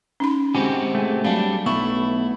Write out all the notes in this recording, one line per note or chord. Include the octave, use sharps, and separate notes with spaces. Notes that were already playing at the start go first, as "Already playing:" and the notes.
C#4 D#4 B5
G#3 C4 F#4 G4 G#5
G#3 A3 G#5
F#3 G3 D4 F5
B1 A3 B3 E4 C#6